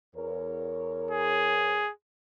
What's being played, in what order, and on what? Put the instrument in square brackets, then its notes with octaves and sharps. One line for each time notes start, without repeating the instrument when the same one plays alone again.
[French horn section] E2 A#4 C#5
[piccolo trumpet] G#4